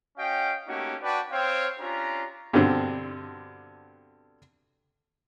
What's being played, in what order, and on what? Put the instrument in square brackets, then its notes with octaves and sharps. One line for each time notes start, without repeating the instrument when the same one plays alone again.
[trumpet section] C#4 F#4 D#5 F5 G5
A3 A#3 C#4 D#4 F#4 G4
D4 F#4 B4 D5 G5 A5
C4 C5 C#5 F5 G5
C#4 D4 F4 G4 A#5
[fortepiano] G2 B2 D3 C4